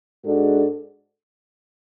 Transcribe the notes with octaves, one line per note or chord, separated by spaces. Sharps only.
G#2 G#3 D4 F#4 A4